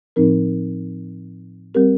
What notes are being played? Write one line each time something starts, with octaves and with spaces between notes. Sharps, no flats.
A2 F3 C4 D#4 A#4
G3 C4 G4 A#4